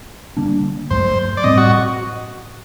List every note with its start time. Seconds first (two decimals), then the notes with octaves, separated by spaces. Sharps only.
0.37 D3 G3 A#3 D4
0.90 G2 F#3 A3 C5
1.37 D5
1.44 A2 G3 C4 D#5
1.57 F#4